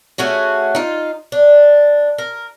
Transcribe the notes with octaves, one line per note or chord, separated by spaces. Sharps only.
A3 C#4 F#4 G#4
D#4 F4
D4
A#4